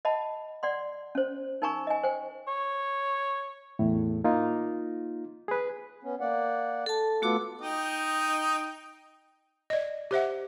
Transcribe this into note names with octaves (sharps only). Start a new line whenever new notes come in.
D#5 F#5 A5 B5
D5 F#5 C6
C#4 C5
D#4 A#4 G#5 A#5 C#6
D#5 G#5
C5 G5 G#5
C#5
E2 A2
A#3 D#4 F4
G#4 B4
B3 C#4
A#3 D5 F#5
A4 A5
A3 B3 F4 F#4 A4 D6
D#4 D#5 G5
D5 D#5
G4 C5 E5 F#5